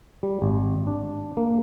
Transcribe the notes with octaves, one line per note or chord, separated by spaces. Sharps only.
G3
G#1
D4
A#3